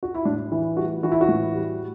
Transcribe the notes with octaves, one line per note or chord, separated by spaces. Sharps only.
F#4
E4
A2 D4
E3 E4
G3 F#4
E3 F#4
E4
F#4
A2
G3